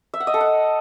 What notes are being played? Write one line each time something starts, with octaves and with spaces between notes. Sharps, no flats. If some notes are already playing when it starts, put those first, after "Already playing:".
E5
F#5
D#5
A4
F#5